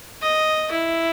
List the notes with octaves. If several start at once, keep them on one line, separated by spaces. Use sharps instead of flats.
D#5
E4